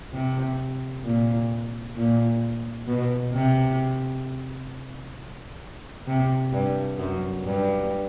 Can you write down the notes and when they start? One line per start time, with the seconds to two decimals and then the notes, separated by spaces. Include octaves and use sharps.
0.13 C3
1.05 A#2
1.96 A#2
2.87 B2
3.34 C3
6.07 C3
6.53 G2
6.98 F#2
7.44 G2